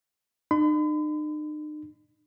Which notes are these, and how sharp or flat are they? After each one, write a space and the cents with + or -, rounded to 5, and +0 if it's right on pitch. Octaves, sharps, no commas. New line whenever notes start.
D#4 -45 B5 +45